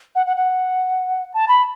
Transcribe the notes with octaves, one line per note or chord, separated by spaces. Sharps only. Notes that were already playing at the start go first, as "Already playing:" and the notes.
F#5
F#5
F#5
A5
B5